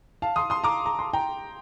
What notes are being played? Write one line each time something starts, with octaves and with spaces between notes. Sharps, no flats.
F5 A5
C6 D#6
C6 D#6
A#5 D6
A#5
C6
G5 A#5